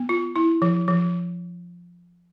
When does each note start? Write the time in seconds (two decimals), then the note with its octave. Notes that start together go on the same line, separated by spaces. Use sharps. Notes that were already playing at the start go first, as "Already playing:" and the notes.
Already playing: B3
0.09 F4
0.36 E4
0.62 F3
0.88 F3